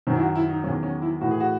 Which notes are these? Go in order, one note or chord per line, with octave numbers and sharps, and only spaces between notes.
F#2 D#3 F#3
E4
F#4
E4
D#4
E2 D#3 F#3 C#4
C#4
E4
A2 E3 F#4
G#4
F#4